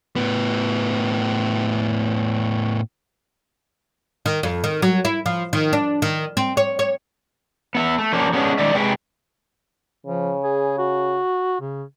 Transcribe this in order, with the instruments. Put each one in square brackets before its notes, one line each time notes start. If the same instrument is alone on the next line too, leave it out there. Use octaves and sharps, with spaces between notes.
[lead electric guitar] A2 B3
[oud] D#3
F2
D#3
F#3
E4
F3
D#3
D4
D#3
C4
C#5
C#5
[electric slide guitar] B3 E5
A3
F3 A#3 C#4 D4
G#3 B3 C#4 D4
D#3 G#3 D5 E5
C3 G#3 B4 G5
[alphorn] C#3 [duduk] F3
[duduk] G#4
F#4
C#3